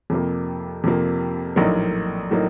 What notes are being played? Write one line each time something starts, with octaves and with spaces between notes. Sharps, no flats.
F2 C3 F3 A#3
F2 C3 F3 A#3
A#1 A2 F#3 A#3 D#4
A2 F#3 A#3 D#4